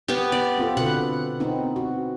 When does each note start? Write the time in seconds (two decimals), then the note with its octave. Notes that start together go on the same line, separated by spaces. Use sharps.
0.08 B3 G4
0.32 D5
0.58 C4 F4 A4
0.77 B2 D3 B4 F#5
1.40 B3 C4 D#4
1.76 F#4